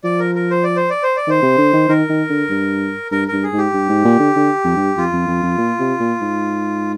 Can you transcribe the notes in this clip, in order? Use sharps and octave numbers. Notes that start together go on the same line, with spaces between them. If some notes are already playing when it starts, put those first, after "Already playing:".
F3 D5
A#4
A#4
C5
D5
C5
D5
C5
D5
D#3 C5
C3
D3
D#3
D#3 A#4
D#3
D3
G2
G2 A#4
G2 A#4
G#4
G#2 G4
G2
G#2
A#2
D3
D3
F2
G2
F2 F4
F2
F2
F2
A#2
C3
A#2
G#2